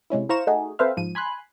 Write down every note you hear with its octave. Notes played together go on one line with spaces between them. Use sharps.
C3 G#3 C#4 E4
E4 C5 F5 A#5 C#6 E7
A3 D#4 F#4 G#4
C4 A4 B4 C5 E5 F5
G#2 F3 D#7
G#5 B5 C6 F#6